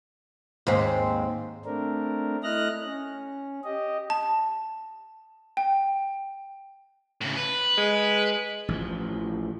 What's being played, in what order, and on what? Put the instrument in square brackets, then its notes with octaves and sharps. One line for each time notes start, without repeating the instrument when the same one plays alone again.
[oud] D#2 G#2 C4
[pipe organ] A3 C4 D4 A#4
A3 E4 D#5 F6 F#6 A#6
C#4
G4 D#5
[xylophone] A5
G5
[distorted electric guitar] A2 C#3
B4
[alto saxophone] G#3
[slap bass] A1 E3 F3